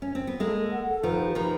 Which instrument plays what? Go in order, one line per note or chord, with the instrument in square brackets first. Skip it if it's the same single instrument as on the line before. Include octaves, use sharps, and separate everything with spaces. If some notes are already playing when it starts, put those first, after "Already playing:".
[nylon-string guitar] C#4
C4
B3
[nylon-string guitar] G#3 A#3 [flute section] A4
[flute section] A4
F#5
A4
[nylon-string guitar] D#3 F3 [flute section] B4
[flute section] G4
[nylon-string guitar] D#3 F3 [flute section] B4